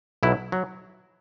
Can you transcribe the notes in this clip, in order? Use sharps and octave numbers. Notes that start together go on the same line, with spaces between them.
B1 B2 F#3 E4
F#3